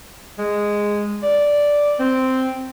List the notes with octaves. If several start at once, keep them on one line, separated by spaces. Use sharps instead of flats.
G#3
D5
C4